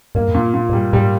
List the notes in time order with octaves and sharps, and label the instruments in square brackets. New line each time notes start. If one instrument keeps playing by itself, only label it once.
[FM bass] G2 [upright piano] A#3
[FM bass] E2
[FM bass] G2 [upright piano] A#2
[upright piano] A#2
[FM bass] G#2
[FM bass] G2 [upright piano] G3
[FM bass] G#2 [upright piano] G3